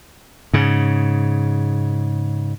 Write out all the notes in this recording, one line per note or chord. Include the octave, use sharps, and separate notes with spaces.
G#2 C#3